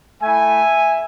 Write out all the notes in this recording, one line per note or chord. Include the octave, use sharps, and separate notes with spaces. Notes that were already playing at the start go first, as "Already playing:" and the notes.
A3 E4 E5 G#5